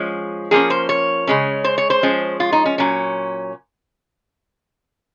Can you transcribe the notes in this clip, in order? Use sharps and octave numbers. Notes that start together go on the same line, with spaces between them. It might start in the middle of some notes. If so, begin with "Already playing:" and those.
Already playing: F3 G#3 C#4
F3 A#3 C#4 G#4
C5
C#5
C#3 G#3 C#4
C5
C#5
C5
F3 G#3 C#4
F4
D#4
C#4
A#2 F#3 C#4